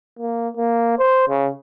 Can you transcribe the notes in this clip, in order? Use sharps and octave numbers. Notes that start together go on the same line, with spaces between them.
A#3
A#3
C5
C#3